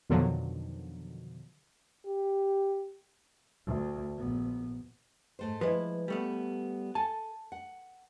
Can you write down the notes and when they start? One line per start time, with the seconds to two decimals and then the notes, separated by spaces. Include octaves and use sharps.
0.09 F2 B2 D3 D#3 F3 F#3
2.06 G4
3.66 D2
4.17 A#1 B3
5.39 G#2 A3 C5
5.61 F3 G#3 E4 B4
6.08 G3 A3 B3
6.95 A4 G#5 A5
7.52 F#5